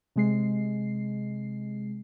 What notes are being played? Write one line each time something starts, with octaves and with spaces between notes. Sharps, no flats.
C3 G#3 C7